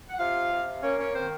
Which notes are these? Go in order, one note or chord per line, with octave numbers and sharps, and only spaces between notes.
F#5
C3 F4 F5
C3
A#3 C#4 C#5
C#4 C#5
D#3 C4 C5